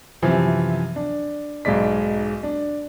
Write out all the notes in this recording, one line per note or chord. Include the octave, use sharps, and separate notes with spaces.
F#2 C3 E3 F3
D4
B1 G#2 G#3 D5 B6
D4